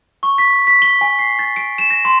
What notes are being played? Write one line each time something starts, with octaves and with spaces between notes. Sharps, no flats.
C#6
B6
B6
G7
G#5
C7
A6
D7
E7
A#6
C6